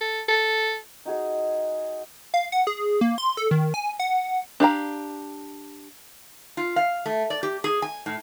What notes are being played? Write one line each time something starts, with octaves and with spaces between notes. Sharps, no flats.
A4
A4
D#4 F#4 G#4 D#5
F5
F#5
G#4
A#3
C6
A4
D#3
G#5
F#5
D4 G4 F5 A#5
F4
F5
A3
D5
G4
G#4
G#5
A2